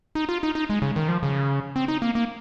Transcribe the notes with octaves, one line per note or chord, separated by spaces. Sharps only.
D#4
F4
D#4
D#4
G#3
C#3
D#3
F3
C#3
C4
D#4
A#3
A#3